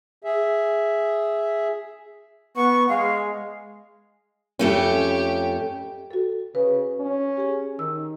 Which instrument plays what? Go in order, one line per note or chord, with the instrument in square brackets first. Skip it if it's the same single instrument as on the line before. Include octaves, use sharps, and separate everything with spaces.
[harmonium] G#4 E5
[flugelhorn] B3 [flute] C#6
[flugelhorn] G#3 [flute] F5
[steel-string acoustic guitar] F2 A3 C#4 [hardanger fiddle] G4
[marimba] F#4 A4
[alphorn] C#3 [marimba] B4
[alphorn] C#4
[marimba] G4 G#4
[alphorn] D#3 [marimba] E6